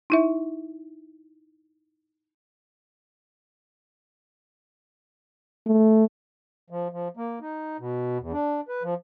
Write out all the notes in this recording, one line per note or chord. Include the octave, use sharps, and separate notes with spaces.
D#4 E4 E5
A3
F3
F3
A#3
D#4
B2
E2
D4
B4
F3